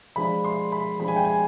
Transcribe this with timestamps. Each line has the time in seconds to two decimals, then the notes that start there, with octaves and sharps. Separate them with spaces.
0.16 F3 G#3 D4 B5
0.44 C6
0.72 B5
0.99 F3 G#3 D4 B5
1.08 G#5
1.16 G5
1.25 G#5